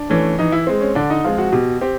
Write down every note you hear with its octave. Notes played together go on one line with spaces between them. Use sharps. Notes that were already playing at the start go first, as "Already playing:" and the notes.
Already playing: D4
E3 A3 C#4
E3 D#4
E4
G#3 C4
C#4
D3 D4
D#4
F3 G#3 C4 F4
F#4
B2 G4
C4 G4